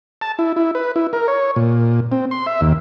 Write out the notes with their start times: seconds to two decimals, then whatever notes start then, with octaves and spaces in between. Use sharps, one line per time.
0.21 A5
0.39 E4
0.56 E4
0.75 B4
0.96 E4
1.13 A#4
1.28 C#5
1.56 A#2
2.12 C4
2.31 C6
2.47 E5
2.61 D#2